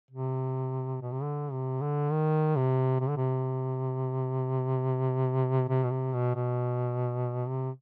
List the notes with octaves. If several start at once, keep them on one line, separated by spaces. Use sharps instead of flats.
C3
B2
C3
D3
C3
D3
D#3
C3
C3
D3
C3
C3
B2
C3
B2
B2
C3